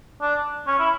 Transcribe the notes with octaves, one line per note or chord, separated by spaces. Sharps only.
D4
C#4
E4